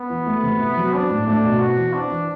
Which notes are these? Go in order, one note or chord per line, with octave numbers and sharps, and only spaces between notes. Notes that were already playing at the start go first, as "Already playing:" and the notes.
Already playing: B3
E3
A3
C3
E4
F#3
C4 D4
A2
A3 D4
B2
C4 F#4
E3
C4 D4
E3